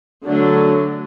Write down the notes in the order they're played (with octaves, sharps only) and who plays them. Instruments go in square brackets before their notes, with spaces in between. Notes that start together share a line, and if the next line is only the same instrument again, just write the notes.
[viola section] D3 F#3 A3 D4